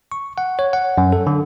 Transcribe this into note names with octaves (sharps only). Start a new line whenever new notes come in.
C#6
F#5
C#5
F#5
F#2
A4
D3